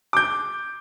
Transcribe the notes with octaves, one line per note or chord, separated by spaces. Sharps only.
D6 G6